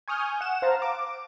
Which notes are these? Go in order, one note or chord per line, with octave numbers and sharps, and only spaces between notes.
G#5 C#6 D#6 F6 G6
F#5 E7
C5 F5 A5 A#5
D6